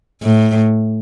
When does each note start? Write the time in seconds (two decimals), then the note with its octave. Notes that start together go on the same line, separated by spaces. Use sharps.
0.22 A2